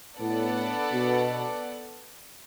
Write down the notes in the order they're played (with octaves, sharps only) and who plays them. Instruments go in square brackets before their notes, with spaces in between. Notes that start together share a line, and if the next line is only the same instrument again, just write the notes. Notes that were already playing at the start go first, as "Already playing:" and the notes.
[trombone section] A2 [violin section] B3 D4 A4 D5 F#5
[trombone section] B2